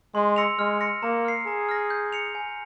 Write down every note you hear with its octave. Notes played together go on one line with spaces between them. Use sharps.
G#3 C6
E6 A#6 C#7 F7
G#3 F6
A#6 C#7
A#3 A#5
F6 C7
G#4 A#5
F6 A#6
G6
C#7 F7
G#5